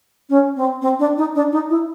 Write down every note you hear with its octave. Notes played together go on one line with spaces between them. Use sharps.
C#4
C4
C4
D4
D#4
D4
D#4
E4